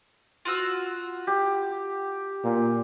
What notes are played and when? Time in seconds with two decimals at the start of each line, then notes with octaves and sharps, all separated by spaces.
0.45 F4 F#4 E6
1.27 G4
2.43 A#2